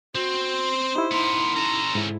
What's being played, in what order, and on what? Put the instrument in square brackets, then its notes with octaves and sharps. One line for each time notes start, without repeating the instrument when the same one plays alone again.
[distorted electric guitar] C4 [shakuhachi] F#4 [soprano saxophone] C5
[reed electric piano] D#4 E4 [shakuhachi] G4
[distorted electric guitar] B3 A#4 [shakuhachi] C6
[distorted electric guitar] C#4 A4 [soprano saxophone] A#5
[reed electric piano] G#2 E4